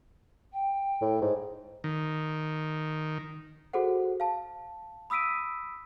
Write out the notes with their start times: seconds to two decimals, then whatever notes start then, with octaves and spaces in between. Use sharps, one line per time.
0.53 G5
1.02 A2
1.22 G#2
1.84 D#3
3.73 F#4 G#4 A4 C5 F#5
4.20 F5 A5
5.10 B5 D#6 E6 B6 D7 D#7